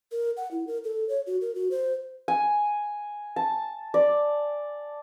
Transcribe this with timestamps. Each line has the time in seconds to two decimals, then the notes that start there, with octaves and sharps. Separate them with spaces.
0.12 A#4
0.37 F#5
0.51 E4
0.67 A#4
0.84 A4
1.09 C#5
1.27 F#4
1.41 A#4
1.55 F#4
1.71 C5
2.28 G#5
3.36 A5
3.94 D5